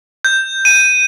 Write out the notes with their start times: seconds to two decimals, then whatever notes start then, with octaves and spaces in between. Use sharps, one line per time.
0.25 G6
0.65 D#7